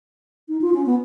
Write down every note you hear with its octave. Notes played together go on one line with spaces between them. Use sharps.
D#4
F4
C#4
B3